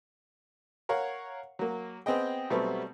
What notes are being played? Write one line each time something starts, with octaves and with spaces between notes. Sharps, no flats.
A#4 C#5 F5 F#5
F#3 A#3
B3 C4 G#4 D#5 G5
B2 F#3 G3 A3 B3 C4